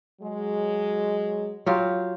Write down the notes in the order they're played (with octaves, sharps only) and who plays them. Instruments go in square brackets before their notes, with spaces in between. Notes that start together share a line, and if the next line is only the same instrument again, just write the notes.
[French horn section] F#3 G#3
[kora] F#3 F4 G4